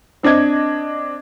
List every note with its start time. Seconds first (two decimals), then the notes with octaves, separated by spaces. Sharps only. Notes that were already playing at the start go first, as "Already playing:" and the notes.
0.23 C4 D4 D#5 G#6